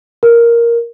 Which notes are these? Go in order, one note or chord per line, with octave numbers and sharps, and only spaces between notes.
A#4